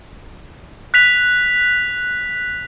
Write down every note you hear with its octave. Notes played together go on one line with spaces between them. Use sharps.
F#6 B6 F7